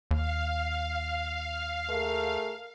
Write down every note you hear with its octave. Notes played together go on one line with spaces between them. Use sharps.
D#2 F5
A3 G#4 A#4